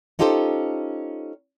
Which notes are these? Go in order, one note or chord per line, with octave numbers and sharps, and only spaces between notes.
C#4 D#4 F4 G4 A4 C5